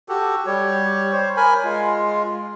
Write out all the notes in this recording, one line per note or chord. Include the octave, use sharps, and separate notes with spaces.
F#4 G4 A4
G3 G4 C#5
C5 C#5
A#4 G#5 B5
G#3 F4